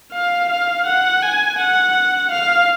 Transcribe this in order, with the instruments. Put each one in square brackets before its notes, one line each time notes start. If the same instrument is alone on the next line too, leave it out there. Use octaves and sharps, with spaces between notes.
[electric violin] F5
F5
F#5
G#5
F#5
F5